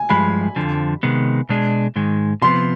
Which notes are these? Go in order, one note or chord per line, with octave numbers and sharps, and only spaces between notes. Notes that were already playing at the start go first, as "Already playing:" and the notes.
Already playing: G#5
G2 F3 G#3 B5
F2 D3 F3
C3 D#3 G#3 B3
B2 G#3 D4 G#4
G#2 D#3 G#3
C3 F3 B3 C6